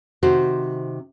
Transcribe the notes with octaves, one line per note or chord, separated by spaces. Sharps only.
C3 D#3 F#4 C5